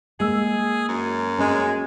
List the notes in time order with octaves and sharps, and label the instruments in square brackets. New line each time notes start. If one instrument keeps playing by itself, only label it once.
[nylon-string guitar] G#3 [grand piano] A#3 E6 [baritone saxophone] G#4
[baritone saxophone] F#2
[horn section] G#3 G#5 [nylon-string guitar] C#4